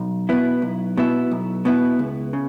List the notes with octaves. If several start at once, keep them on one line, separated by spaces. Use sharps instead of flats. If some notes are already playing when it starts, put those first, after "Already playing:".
Already playing: B1
B2 B3 E4
B1
B2 B3 E4
B1
B2 B3 E4
C#2
C#3